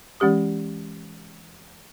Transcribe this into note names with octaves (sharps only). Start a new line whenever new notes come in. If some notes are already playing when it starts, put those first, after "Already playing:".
E3 G#3 C#4 G4 D#6